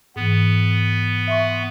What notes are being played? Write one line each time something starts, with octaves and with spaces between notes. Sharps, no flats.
G#2 E3 B3
E5 C6 C#6